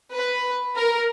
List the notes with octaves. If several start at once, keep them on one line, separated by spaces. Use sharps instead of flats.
B4
A#4